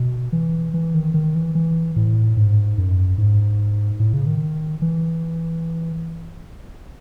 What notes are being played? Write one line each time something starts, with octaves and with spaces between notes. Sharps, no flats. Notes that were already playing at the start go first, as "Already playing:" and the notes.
Already playing: B2
E3
E3
D#3
D#3
E3
E3
A2
G#2
F#2
G#2
A2
C#3
D#3
E3